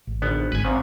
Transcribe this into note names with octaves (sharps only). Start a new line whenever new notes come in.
A1
G#1 D3 B3
G#1 B4 G#5
E2 A#2 C#3 C4